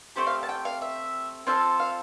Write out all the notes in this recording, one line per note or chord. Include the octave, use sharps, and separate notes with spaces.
A3 C4 G4 C5
F5
A5
G5
F5
E5
C4 F4 A4 F5
F5